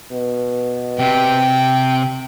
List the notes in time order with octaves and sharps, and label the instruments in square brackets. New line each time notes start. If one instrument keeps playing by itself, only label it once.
[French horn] B2
[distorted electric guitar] C3 [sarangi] G5